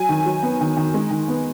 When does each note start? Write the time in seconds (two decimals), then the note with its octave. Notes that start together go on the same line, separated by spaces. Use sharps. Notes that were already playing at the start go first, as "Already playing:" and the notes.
Already playing: F#3 G#5
0.09 D#3
0.26 F#3
0.43 B3
0.61 D#3
0.77 D#3
0.94 G#3
1.11 D#3
1.28 B3